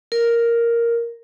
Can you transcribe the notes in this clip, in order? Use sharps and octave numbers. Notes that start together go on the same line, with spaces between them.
A#4